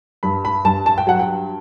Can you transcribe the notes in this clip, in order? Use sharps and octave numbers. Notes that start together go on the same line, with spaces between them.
G2 B5
B5
G2 A5
A5
G5
F#3 F#5
G5